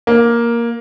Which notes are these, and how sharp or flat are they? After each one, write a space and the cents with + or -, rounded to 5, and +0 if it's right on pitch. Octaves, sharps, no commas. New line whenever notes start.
A#3 +5